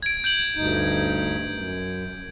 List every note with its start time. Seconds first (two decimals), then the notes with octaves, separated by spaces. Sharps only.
0.03 G#6 D7
0.24 G6 D7 F#7
0.56 D2 G2 D#4
1.51 F#2